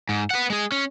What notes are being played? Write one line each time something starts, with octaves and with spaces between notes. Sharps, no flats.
G#2
B4 F#5
G#3 G#4
C#4